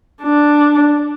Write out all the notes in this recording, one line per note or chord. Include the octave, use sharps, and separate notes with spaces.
D4